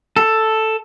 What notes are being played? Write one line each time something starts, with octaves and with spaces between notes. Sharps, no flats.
A4